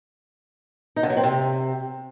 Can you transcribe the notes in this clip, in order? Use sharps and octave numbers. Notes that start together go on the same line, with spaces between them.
D#4
D3
F#3
C4
C3